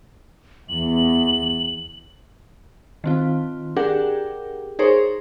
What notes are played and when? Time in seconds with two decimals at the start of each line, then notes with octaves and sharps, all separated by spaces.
0.69 E2 F#7
3.04 D#3 C4 F4
3.76 D4 G4 G#4 A#4 F#5 G5
4.79 D#4 G#4 A#4 C5 C#5